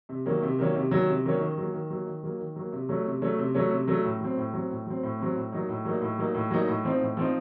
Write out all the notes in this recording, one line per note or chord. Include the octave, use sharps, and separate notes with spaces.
C3
D#3 F#3 A#3 C#4
C3
D#3 F#3 A#3 C#4
C3
D#3 F#3 A#3 C#4
C3
D#3 F#3 A#3 C#4
D#3
F#3 A#3
D#3
F#3 A#3
D#3
F#3 A#3
D#3
F#3 A#3
C3
F#3 A3 C#4
C3
F#3 A3 C#4
C3
F#3 A3 C#4
C3
F#3 A3 C#4
A2
F#3 C4
A2
F#3 C4
A2
F#3 C4
A2
F#3 C4
A2
F#3 A#3 D#4
A2
F#3 A#3 D#4
A2
F#3 A#3 D#4
A2
F#3 A#3 D#4
A2
F3 C4 D#4
A2
F3 C4 D#4